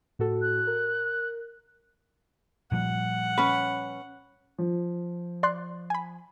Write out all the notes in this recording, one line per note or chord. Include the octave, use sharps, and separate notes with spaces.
A2 F#4 A4
F#6
A#4
A#2 F3 G3 F#5
C#4 B4
F3
D5 C6 F#6
G#5 B5